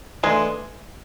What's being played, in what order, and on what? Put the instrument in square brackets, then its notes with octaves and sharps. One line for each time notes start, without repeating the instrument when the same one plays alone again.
[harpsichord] E3 A3 D4 [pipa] G#3